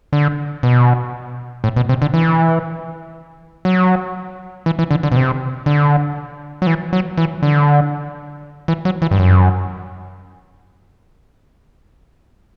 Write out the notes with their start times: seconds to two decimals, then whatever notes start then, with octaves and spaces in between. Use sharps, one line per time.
0.13 D3
0.63 B2
1.64 A2
1.76 B2
1.89 C3
2.02 D3
2.14 E3
3.65 F#3
4.66 E3
4.79 E3
4.91 D3
5.03 D3
5.12 B2
5.16 C3
5.66 D3
6.62 F#3
6.67 E3
6.93 F#3
7.17 E3
7.43 D3
8.68 E3
8.85 F#3
9.02 E3
9.11 G2
9.19 F#2